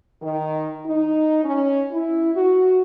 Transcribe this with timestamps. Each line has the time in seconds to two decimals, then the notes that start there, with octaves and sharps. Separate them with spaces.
0.21 D#3
0.85 D#4
1.44 C#4
1.92 E4
2.36 F#4